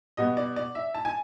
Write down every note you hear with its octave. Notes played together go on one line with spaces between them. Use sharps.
B2 G3 B3 D#5
D5
D5
E5
A5
G#5